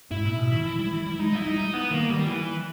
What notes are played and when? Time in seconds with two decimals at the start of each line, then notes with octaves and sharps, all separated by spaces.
0.11 G#2 E4
0.25 A#2
0.39 B2
0.52 D#3
0.66 E3
0.79 G3
0.93 E3
1.06 G3
1.19 G#3 D#4
1.32 G3 E4
1.46 G3 D#4
1.61 G3
1.74 B3
1.91 D#3 A#3
2.09 D#3 G3
2.27 E3